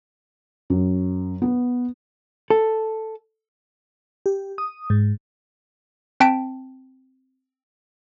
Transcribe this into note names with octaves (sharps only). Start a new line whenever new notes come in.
F#2
B3
A4
G4
D#6
G#2
C4 G5 A5 B6 D7